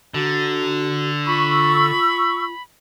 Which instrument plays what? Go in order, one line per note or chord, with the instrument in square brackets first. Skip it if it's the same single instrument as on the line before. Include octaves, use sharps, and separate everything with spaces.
[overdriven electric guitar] D3 [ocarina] F#4 [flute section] A#5
[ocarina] F4 [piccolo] B5 [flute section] C#6 E6